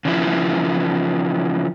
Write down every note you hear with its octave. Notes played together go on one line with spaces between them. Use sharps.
C#3 E3 F3 E4